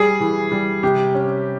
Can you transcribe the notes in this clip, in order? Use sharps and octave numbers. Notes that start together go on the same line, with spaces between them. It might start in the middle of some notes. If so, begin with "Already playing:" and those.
Already playing: G3 G#4
E3
G3
C3 G4
C#4